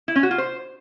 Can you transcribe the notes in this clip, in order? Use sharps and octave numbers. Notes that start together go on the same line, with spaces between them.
E4
C#4
F#4
F4
C5